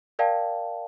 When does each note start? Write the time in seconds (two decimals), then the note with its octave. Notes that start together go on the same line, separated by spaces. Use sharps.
0.19 A#4 D5 F5 G5 A5